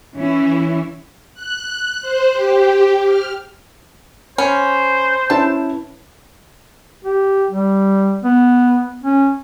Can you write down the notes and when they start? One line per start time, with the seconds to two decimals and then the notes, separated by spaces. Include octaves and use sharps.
0.15 E3 C#4 E4
1.34 F#6
2.02 C5
2.33 G4
3.05 F6
4.38 C#4 C5 B5
5.30 C#4 E4 B4 A5
7.05 G4
7.51 G3
8.24 B3
9.03 C#4